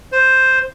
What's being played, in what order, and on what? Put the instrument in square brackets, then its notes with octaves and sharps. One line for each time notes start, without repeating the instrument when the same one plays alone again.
[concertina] C5